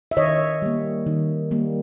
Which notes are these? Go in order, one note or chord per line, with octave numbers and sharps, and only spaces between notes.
E5
D#3 C#5 D#5
G3 A#3
D#3
G3 A#3